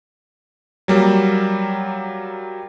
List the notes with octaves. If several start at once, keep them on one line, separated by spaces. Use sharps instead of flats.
F#3 G3 A#3